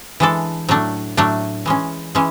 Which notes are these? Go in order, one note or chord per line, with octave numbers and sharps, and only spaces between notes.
E3 G#3 D4 A4
A2 F#3 A3 D4
A2 F#3 A3 D4
E3 G#3 C#4
E3 G#3 C#4